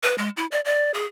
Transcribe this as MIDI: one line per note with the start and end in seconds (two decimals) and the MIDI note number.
0.03 0.16 71
0.18 0.29 56
0.37 0.46 64
0.52 0.61 74
0.65 0.91 74
0.94 1.05 68